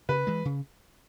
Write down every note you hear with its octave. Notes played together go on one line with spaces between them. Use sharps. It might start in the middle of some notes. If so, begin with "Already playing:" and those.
C#3 B4
E3 G#3
C#3